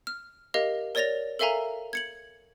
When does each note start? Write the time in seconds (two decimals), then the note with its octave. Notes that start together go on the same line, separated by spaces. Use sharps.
0.07 F6
0.54 G4 A#4 D#5 F5
0.95 A#4 C#5 D5 A6 A#6 F7
1.39 A4 A#4 E5 F5 G#5 A#5
1.93 G#6 C#7 F#7